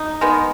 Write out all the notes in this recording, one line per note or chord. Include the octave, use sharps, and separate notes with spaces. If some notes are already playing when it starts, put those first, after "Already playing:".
Already playing: D#4
D#3 G#3 B3